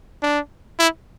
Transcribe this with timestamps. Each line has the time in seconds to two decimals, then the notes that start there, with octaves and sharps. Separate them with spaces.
0.23 D4
0.79 E4